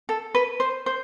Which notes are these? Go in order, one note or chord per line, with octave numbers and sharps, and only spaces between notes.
A4
B4
C5
C5